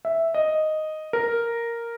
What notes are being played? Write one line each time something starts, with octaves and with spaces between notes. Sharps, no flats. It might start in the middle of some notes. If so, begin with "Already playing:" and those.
E5
D#5
A#4